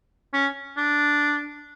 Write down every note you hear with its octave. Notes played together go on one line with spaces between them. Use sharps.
C#4
D4